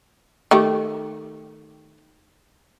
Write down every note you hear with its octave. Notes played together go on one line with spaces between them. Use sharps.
D#3 A3 G4